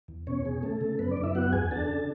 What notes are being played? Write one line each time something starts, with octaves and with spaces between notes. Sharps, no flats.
E2
B2 C#4 C#5
B2 G#4
C#3 A3 A4
C#3
F#2 B3 B4
D4 D5
F#2
E4 E5
B3 F#4 F#5
E2 G#4 G#5
D4 A4 A5
C#3